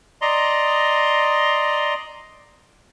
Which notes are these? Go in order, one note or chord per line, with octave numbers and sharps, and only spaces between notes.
D5 D#5 A#5 C6